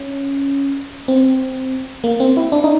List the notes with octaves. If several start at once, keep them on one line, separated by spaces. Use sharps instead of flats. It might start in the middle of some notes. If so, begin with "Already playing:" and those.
Already playing: C#4
C4
A#3
C4
E4
D4
D#4